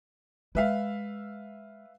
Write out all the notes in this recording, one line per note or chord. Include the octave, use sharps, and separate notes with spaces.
G#3 B4 E5 F5